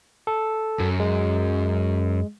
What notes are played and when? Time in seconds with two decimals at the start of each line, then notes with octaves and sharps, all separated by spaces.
0.27 A4
0.80 F#2
1.00 G#3